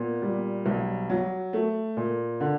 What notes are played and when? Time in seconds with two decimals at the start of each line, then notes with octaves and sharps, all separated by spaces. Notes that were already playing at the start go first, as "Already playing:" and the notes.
Already playing: A#2 B3
0.22 G3
0.66 B1
1.10 F#3
1.53 A3
1.97 A#2
2.40 D3